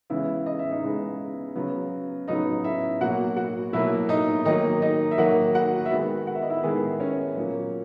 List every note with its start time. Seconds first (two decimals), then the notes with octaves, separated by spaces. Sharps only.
0.10 C#3 E3 G#3 B3 E4
0.46 D#5
0.59 E5
0.71 D#4 D#5
0.83 C#3 G#3 B3
1.56 C#3 F#3 B3
2.28 C#3 F#3 B3 D#4 D#5
2.64 E4 E5
3.01 B2 F#3 A#3 F#4 F#5
3.36 F#4 F#5
3.73 B2 F#3 A#3 E4 E5
4.09 D#4 D#5
4.45 D#3 F#3 A#3 D#4 D#5
4.82 D#4 D#5
5.11 E5
5.18 D#3 F#3 A#3 F#4 F#5
5.55 F#4 F#5
5.86 E5
5.91 D#3 G#3 B3 F#4 F#5
6.27 F#5
6.35 E5
6.42 D#5
6.50 E4 E5
6.63 D#3 G#3 B3 G#4
7.00 C#4 C#5
7.36 A#2 F#3 A#3